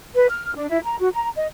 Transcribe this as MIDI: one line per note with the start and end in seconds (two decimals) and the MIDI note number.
0.14 0.26 71
0.29 0.53 89
0.55 0.69 62
0.70 0.78 64
0.84 0.96 82
1.00 1.08 66
1.13 1.29 82
1.36 1.46 75